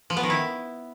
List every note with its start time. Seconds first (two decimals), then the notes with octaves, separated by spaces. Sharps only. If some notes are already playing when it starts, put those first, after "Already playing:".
0.10 F3
0.17 B3
0.23 D#3
0.30 E4